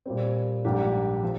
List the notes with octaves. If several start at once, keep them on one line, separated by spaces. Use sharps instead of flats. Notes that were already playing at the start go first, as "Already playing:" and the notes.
A#2 G3 C4
A#1 G#2 G3 D4 G4
F3